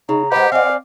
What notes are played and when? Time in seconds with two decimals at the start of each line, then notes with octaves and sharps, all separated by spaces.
0.09 C#3 D#4 A#5
0.32 G#3 G4 B4 C5 D#5 F#5
0.52 C4 D5 F5 G#5